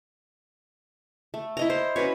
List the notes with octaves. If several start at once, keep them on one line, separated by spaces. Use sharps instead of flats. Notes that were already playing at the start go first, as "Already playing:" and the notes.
A3
E4 D#5 A#5
C5
C#4 F#4 B4 C#5